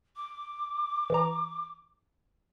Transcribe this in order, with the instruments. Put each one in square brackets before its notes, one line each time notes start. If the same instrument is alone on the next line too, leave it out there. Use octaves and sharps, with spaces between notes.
[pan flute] D6
[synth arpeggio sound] E3 A#5